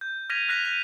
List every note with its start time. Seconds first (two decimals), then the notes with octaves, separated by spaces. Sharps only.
0.01 G6
0.30 F6 G#6 A#6 B6 D#7 F7
0.48 F6 F#6 A#6 B6 F7
0.65 D#7 F7